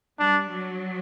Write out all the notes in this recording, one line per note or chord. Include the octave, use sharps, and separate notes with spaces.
G3 D4
F#3